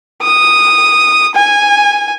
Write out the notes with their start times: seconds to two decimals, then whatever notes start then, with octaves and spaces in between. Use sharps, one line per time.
0.23 D#6
1.35 G#5